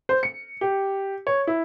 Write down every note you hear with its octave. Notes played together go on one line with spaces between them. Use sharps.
C5
C#7
G4
C#5
E4